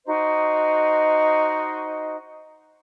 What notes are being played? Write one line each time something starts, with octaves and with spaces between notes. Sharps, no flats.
D#4 F#4 C5 D#5